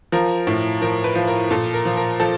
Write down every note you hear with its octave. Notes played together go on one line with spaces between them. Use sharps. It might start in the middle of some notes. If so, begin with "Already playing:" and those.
F3 A#4
A2
F3 A#4
B4
F3
A#4
A#2 A4
A#4
F3
A#4
F3 A4